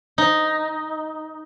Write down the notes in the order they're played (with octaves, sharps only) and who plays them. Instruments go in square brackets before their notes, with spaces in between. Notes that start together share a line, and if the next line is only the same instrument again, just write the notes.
[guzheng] D#4